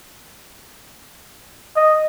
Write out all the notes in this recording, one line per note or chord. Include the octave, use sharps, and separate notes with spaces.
D#5